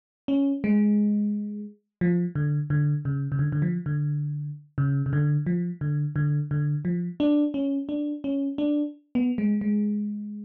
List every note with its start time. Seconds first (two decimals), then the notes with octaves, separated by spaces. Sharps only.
0.28 C#4
0.64 G#3
2.01 F3
2.35 D3
2.70 D3
3.05 C#3
3.32 C#3
3.39 D3
3.52 D3
3.62 F3
3.86 D3
4.78 C#3
5.06 C#3
5.13 D3
5.46 F3
5.81 D3
6.16 D3
6.51 D3
6.85 F3
7.20 D4
7.54 C#4
7.89 D4
8.24 C#4
8.58 D4
9.15 B3
9.38 G#3
9.61 G#3